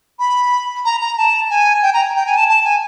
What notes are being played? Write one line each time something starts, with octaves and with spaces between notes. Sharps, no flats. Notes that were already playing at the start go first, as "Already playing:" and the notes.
B5
A#5
A#5
A5
G#5
G5
A#5
G5
G#5
A5
A5
G#5